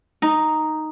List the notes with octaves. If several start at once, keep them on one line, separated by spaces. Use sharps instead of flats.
D#4